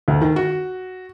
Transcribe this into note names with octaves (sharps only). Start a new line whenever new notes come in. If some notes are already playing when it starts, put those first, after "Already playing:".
D2
D#3
F#4